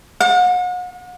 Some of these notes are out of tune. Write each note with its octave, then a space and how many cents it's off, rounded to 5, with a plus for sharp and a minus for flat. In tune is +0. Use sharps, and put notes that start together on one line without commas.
F#5 -40